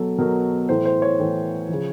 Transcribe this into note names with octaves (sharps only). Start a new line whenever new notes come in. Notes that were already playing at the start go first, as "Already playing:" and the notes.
Already playing: B2 F#3 A4
B2 F#3 A#4
A2 E3 C5
C5
C#5
A2 E3
C#3 F3